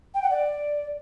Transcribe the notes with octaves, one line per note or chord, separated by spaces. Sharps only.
G5
F#5
D5